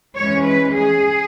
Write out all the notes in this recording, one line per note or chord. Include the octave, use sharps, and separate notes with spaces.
E3 G#3 C#4 C#5
B4
G#4